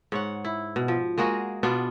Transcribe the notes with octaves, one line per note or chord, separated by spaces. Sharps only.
G#2 C#5 F#5
E4
B2
F3
G#3 A#3 F#4 G#4
B2 B3 D4 F4